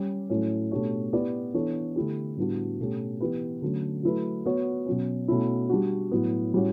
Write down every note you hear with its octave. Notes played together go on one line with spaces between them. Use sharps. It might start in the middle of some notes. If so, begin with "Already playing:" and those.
Already playing: G3 C#4 G4
A2 F#3 A3 C#4
B2 A3 D4 G4 C#5
B3 E4 G4 B4 D5
E3 B3 D4 A4 C#5
D3 A3 E4 G4
A2 G3 B3 D4 F#4
B2 A3 C#4 G4
E3 B3 E4 G4 B4
D3 F#3 A3 C#4
F#3 A3 E4 B4
B3 F#4 C#5
B2 F#3 C#4
B2 A3 C#4 E4
G3 D4 F#4
A2 F#3 B3
A2 G3 C#4 F#4